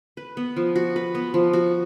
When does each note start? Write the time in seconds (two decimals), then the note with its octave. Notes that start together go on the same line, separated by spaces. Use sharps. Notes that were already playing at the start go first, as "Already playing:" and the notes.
0.17 B4
0.37 B3
0.56 F3
0.76 F#4
0.96 B4
1.15 B3
1.34 F3
1.53 F#4